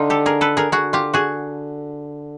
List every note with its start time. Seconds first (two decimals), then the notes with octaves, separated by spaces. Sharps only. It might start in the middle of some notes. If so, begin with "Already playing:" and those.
Already playing: D3 D#4 F4
0.10 G4 A4
0.26 G#4 A#4
0.41 A4 B4
0.57 G#4 A#4
0.72 D3 F#4 G#4
0.93 F4 G4
1.14 F#4 G#4